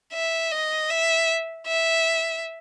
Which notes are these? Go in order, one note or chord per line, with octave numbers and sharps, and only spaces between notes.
E5
D#5
E5
E5